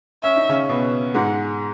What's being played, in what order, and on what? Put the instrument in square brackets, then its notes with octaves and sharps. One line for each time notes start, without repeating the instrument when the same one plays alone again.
[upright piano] C#4 [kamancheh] E5
[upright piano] D#4
C#3 C#4
B2 B3
[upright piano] G#2 G#3 [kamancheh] F#5